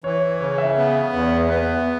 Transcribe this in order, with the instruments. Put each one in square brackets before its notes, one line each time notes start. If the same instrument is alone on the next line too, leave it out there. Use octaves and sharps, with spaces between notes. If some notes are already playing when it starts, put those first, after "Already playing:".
[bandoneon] E3 [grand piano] C#5
[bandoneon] C#3 [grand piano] C#5
[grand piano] E5
[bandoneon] B3
E2
[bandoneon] B3 [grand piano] B4